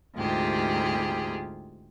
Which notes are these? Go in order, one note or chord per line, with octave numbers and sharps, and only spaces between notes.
D2 G#2 C3 F4 G4 G#4